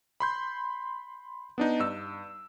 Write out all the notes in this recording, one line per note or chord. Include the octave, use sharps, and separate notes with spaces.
B5 C6 G6
B3 D4 D#4
G2 E6